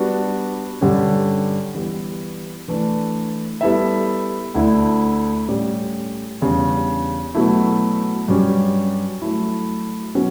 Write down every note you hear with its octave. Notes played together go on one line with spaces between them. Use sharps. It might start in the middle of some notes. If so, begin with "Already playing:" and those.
Already playing: G3 B3 D4 F#4
G2 D3 G3 C#4 G4
E3 G3 B3
E3 A3 D4
G3 B3 E4 A4 E5
D2 D3 A3 E4
A2 G3 C#4 G4 D5
E2 C#3 G3 D4
B2 F#3 A3 E4
G2 F#3 C#4 G4
F#3 A3 E4
B2 F#3 C#4